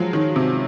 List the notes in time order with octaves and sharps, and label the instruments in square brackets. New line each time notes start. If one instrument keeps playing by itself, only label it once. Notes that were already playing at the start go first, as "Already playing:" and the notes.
Already playing: [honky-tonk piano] F3 F#3 G#3
D#3
C3